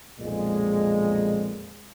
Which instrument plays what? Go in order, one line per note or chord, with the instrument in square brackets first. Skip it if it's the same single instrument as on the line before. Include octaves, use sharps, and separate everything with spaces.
[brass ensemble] B1 F2 A#2 G#3